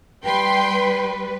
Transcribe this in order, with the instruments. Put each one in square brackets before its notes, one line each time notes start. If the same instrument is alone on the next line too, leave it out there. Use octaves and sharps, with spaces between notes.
[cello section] G3 B4 [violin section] G5 C6